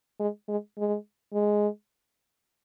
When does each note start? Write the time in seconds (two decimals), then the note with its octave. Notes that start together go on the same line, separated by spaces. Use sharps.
0.20 G#3
0.48 G#3
0.78 G#3
1.34 G#3